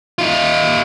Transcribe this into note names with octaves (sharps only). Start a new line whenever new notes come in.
D#4 F4